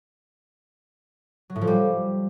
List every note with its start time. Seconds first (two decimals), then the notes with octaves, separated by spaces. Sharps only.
1.50 F#3
1.56 A2
1.61 F3
1.67 G3